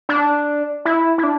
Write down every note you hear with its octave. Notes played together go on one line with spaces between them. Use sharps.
D4
E4
E4
D4